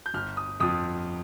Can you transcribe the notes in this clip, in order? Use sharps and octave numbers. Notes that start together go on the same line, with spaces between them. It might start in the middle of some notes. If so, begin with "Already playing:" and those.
G6
G1 F6
D#6
F2 F3 D#6